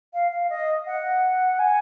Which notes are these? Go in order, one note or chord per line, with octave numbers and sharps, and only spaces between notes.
F5
F5
D#5
F#5
G#5